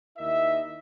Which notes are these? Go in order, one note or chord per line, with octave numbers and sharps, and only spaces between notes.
D#2 E4 A#4 D#5 E5